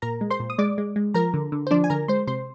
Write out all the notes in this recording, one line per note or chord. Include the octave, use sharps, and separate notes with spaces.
A#2 A#4 A#5
G#3
C5 C6
A#2
D#6
G#3 D5 D6
G#3
G#3
F3 A#4 A#5
D3
D3
C5
F3 D4 D5
G#5
D3 A#4 A#5
G#3 C5 C6
C3 C5 C6